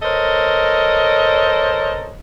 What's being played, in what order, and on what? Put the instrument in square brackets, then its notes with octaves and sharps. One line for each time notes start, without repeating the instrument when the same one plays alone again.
[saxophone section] A4 A#4 C5 C#5 D#5